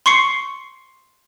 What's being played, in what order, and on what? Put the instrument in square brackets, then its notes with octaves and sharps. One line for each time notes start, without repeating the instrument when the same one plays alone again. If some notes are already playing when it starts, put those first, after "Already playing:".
[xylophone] C6 C#6 C7 C#7